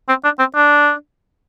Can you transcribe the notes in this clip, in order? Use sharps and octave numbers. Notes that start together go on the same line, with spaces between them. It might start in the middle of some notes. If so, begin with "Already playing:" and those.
C4
D4
C4
D4